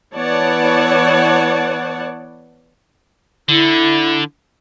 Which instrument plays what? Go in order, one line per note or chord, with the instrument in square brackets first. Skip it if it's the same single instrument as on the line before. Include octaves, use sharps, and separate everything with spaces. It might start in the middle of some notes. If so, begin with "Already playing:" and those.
[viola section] E3 B3 C#5 D5 F#5 A5
[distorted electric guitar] D3 [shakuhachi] E4